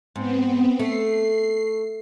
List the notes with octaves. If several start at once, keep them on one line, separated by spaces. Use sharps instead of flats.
G#2 B3 C4
A3 C7